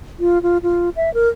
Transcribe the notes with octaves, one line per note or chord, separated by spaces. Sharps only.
F4
F4
F4
E5
A#4